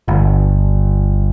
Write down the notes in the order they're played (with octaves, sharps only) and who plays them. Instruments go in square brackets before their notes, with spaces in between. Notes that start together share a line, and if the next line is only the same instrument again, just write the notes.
[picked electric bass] G1